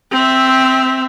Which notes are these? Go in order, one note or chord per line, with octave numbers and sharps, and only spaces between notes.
C4 E5